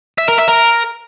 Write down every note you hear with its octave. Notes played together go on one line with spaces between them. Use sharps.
E5
A#4
E5
A#4